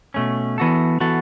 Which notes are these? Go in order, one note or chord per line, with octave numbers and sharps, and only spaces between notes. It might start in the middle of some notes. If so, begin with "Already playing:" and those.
B2 A3 C#4
E3 B3 F#4 A4
E3 B3 F#4 A4